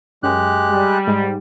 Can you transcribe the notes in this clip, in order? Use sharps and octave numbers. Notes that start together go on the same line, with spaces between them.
F#2 G#3 G4 F#6
G3
G#2